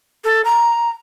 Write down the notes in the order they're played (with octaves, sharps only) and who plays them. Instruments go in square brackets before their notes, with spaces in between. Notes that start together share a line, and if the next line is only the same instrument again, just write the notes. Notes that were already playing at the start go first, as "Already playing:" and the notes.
[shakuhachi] A4
A#5